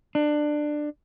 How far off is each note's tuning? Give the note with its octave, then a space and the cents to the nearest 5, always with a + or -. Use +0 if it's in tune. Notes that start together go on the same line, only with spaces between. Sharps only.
D4 +20